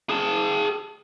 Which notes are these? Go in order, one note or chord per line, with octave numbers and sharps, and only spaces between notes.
G#4 A5